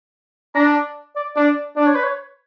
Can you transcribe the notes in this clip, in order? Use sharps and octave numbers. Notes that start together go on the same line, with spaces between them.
D4 A#5
D5
D4 D5
D4 D5
C#5
B4
C#5